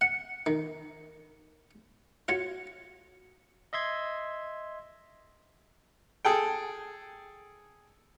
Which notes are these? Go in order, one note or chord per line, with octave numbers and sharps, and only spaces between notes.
F#5
D#3
F4 F#4 C#5
D#5 E5 C6 G#6
G#4 A4 G5